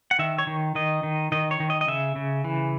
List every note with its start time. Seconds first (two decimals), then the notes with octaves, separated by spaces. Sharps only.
0.11 F#5
0.19 D#3 E5
0.38 C#5
0.47 D#3
0.75 D#3 D#5
1.03 D#3
1.32 D#3 D#5
1.51 C#5
1.60 D#3
1.70 D#5
1.81 D#5
1.88 C#3 E5
2.16 C#3
2.44 E3